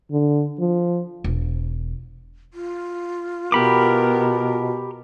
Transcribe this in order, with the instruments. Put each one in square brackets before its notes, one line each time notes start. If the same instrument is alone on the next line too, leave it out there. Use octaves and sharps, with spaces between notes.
[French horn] D3
F3
[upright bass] E1
[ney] F4
[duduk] B2 [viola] B3 A#4 [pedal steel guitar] G4 B5 D6